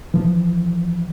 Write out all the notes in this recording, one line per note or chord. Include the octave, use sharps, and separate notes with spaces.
E3 F3